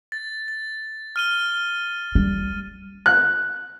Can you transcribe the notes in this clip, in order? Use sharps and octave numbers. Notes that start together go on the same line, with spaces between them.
A6
A6
F6 D#7 G7
G3
F#6